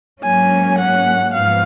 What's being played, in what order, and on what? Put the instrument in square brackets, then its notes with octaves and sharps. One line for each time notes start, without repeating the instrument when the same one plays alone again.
[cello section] G#2 F#3 A#3 C#4 [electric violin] G#5
[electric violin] F#5
[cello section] G#2 F3 B3 [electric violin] F5